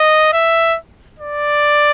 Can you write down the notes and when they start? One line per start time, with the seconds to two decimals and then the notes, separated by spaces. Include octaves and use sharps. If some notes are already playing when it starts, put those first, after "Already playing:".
Already playing: D#5
0.33 E5
1.19 D5